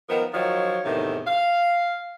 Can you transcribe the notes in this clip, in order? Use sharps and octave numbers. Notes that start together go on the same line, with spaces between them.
D#3 F3 B3 A#4
D#3 F3 F#3 F4 C#5
E2 A2 C3 D#3 D#4
F5